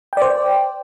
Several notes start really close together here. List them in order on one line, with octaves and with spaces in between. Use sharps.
G5 D5 C5